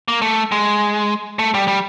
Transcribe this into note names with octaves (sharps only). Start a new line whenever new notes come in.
A#3
A3
G#3
A3
G3
G3